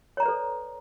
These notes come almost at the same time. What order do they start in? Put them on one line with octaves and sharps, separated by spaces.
C#5 A#5 D5 B4 A4